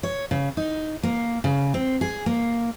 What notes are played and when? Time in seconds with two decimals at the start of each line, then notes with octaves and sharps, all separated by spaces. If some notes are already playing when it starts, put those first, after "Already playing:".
0.03 C#5
0.31 C#3
0.57 D#4
1.03 A#3
1.44 C#3
1.74 C4
2.01 G#4
2.26 A#3